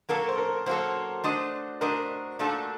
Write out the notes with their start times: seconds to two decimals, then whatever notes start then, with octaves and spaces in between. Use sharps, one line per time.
0.09 F#3 A#3 F#4 A4 A#4
0.29 C5
0.38 A#4
0.66 F#3 A#3 F#4 A4 C5
1.24 A3 D4 F#4 C5 D#5
1.81 A3 D4 F#4 A#4 C5 D#5
2.39 A#2 A3 D4 F#4 A4